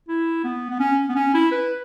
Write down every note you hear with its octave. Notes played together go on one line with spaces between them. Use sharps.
E4
B3
B3
C#4
B3
C#4
E4
B4